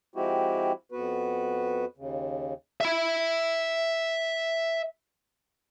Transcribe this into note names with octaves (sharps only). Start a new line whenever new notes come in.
F3 G#3 C4 E4 F#4 G4
F2 B3 F#4 B4
D#2 C#3
E5 B5